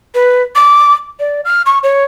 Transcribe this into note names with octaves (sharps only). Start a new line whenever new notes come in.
B4
D6
D5
F6
C#6
C#5